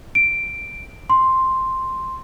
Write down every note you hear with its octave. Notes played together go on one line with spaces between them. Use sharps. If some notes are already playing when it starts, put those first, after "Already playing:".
D7
C6